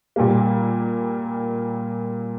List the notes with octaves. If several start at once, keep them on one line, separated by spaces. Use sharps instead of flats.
A#2 G3 A#3